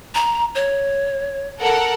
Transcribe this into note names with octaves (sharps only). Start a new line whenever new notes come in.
A#5
C#5
A4 A#4 F#5